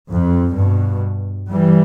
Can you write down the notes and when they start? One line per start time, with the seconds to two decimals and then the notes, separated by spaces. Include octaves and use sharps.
0.10 F2
0.56 G2 B2
1.50 E3 G3